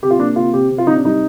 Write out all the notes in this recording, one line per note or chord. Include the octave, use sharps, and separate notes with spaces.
C3 G4
F4
A#3 D4
C3 F4
C3 G4
C3
F4
C3 D#4
D4
G3 D#4